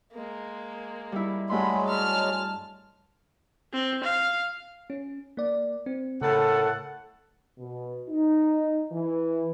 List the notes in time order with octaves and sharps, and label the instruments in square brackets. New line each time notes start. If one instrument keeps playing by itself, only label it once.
[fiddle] G#3 A#3
[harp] G3 E4
[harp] G2 A3 C6 [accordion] F#3 G#3 [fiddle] B5
[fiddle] A5 F6
[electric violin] C4
F5
[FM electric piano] C#4
A#3 D5
C4
[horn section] A2 A4 F#5 [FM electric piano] C#3 A#4 A6
[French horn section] B2
D#4
E3